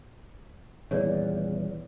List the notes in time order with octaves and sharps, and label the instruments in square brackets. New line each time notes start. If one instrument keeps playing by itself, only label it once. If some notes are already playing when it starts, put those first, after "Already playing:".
[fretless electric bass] D#1 E2 [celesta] C#5 D5